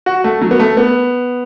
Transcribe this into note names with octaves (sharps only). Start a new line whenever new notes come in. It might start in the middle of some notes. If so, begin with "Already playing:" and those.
F#4
A3
F#3
B3
A3
B3